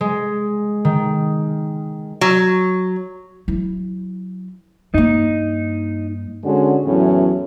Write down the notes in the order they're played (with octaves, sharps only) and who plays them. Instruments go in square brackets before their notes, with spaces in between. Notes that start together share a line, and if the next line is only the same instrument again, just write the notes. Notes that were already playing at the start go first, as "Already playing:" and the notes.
[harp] G#3
D#3
[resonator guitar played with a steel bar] F#3
[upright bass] F#3 E4
[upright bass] G2 A#3 [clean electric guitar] D#4
[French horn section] D3 G#3 C#4 F#4
E2 A2 F#3 C#4